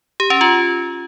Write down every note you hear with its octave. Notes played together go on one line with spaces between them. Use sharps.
G4
C#4
F4